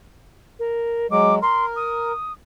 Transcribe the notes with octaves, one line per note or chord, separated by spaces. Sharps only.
A#4
F#3 G#3 D6
A#4 C6
D#6